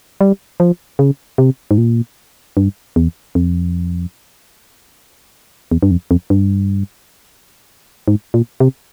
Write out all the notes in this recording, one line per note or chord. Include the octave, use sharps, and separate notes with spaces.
G3
F3
C#3
C3
G#2
A#2
G2
E2
F2
E2
G2
F2
F2
G2
G#2
A#2
C3